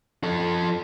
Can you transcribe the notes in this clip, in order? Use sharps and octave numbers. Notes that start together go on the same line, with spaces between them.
F3 A4